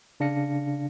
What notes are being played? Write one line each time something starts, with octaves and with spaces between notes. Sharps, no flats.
C#3 D4 F5 A#6 C#7